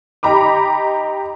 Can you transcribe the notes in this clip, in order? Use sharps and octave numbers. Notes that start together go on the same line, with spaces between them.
D#4 G4 A#5 B5 D6